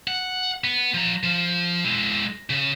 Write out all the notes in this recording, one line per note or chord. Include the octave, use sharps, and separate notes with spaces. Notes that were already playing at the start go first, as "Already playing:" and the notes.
F#5
B3
F3 A#5
F3
G#3 E4
C#3